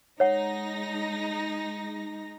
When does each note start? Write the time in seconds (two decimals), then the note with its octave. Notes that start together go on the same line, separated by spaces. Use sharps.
0.20 G#3 D#4 C#5 F#5 A#6